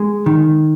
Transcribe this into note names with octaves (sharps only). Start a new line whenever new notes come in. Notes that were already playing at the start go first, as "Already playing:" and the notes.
Already playing: G#3
D#3